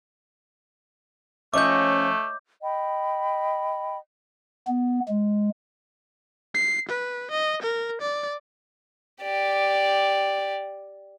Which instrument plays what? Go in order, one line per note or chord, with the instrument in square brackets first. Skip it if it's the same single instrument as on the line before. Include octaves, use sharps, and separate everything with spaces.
[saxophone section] F3 C#4 [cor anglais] A3 [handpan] C#5 D#5 E5 [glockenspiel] D6 G6
[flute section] D#5 G5 B5
[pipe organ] B3
G#3
[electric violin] C7
B4
D#5
A#4
D5
[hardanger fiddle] G4 D5